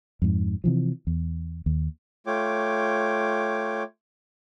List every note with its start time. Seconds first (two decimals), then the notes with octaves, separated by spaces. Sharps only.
0.22 F2 G#2
0.64 C3 E3 F3
1.07 E2
1.66 D#2
2.27 A3 F4 C#5 G5 D6